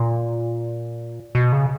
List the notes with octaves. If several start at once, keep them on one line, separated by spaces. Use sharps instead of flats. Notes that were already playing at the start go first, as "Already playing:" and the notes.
Already playing: A#2
B2
C#3